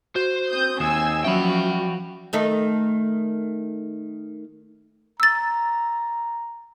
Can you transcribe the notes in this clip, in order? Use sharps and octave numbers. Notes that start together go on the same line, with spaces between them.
F#4 C5
C4 D#6 G6
D#2 G#5 D#6 E6 C7 E7
F3 F#3 C#4 F#4 E5 G5 B5
D#3 A3 D#4
A#5 E6 A6